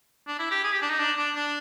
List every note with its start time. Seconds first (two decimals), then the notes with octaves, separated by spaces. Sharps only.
0.27 D4
0.39 E4
0.51 G4
0.64 G#4
0.72 G4
0.82 D4
0.90 D#4
0.99 D4
1.18 D4
1.35 D4